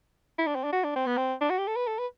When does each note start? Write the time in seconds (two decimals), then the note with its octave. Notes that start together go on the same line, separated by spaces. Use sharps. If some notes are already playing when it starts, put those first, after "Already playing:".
0.38 E4
0.47 D4
0.55 C4
0.64 D4
0.72 F#4
0.84 D4
0.96 C4
1.06 B3
1.17 C4
1.41 D4
1.50 F#4
1.58 G4
1.67 A4
1.76 B4
1.87 A4
1.98 B4